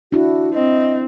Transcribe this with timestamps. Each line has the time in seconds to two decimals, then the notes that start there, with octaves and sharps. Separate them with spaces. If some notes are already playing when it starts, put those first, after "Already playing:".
0.12 D4 E4 F#4
0.54 C4 D#5